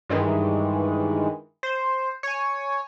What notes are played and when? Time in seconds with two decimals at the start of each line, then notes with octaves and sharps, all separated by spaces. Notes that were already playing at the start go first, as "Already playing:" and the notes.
0.09 G2 D#3 E3 G#3
1.63 C5
2.23 C#5 G#5